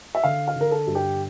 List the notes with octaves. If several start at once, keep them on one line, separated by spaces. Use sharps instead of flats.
E5
D3 F5
F5
D3 A#4
A4
G2
G4